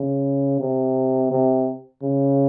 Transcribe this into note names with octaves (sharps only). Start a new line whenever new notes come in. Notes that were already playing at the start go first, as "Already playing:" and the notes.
Already playing: C#3
C3
C3
C#3